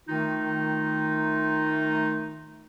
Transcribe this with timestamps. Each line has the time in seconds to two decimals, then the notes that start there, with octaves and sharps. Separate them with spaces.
0.08 D#3 A3 D#4 F4